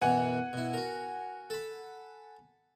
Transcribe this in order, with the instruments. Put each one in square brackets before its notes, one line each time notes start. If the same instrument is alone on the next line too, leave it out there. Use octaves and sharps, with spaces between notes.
[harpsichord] F#2 B2 E3 [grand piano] F#5 G#5
[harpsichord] B2 E4
F#4 A#4
A4 B5